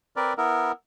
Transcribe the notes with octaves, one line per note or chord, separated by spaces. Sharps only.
C4 A#4 B4 D5
B3 E4 A#4